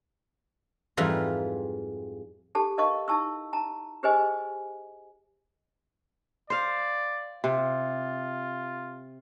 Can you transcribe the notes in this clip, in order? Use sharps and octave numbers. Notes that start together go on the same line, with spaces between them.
F2 G#2 E3 G3 F4 A#5
G4 A4 A5
A#4 D#5 F5 A5 C#6
D#4 E4 A5 C#6 E6
A5 A#5
G4 G#4 B4 C5 D#5 G#5
C5 D5 F5
C3 F4